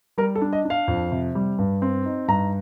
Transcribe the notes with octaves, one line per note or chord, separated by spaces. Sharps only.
G3 A#4
A4
D4
D#5
D4 F5
F2
C3
G3
G2
C4
D#4
G2 A#5